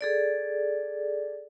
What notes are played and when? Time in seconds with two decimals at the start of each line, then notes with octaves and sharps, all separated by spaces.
0.01 G#4 A4 D5